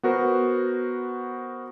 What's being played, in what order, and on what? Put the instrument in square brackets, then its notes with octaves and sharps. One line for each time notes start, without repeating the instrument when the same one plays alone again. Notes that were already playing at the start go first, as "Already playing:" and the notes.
[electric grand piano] B3 F#4 A#4 C5